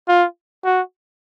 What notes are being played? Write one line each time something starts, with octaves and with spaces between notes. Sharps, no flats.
F4
F#4